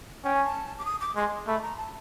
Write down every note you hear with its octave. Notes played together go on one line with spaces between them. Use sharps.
C#4 G5
G#5
A5
D6
D#6
D6
G#3 C6
A3 B5
A#5
A5